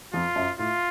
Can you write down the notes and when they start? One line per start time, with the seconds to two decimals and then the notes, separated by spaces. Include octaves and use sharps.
0.13 F2 F4
0.36 F#2
0.59 A2 F4